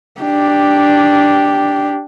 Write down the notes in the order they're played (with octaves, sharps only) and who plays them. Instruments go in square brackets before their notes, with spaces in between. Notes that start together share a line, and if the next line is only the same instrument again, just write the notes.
[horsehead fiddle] D4 G4